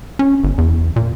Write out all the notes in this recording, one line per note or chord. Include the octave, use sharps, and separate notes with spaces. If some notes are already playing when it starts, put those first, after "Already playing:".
C#4
G1
E2
A#2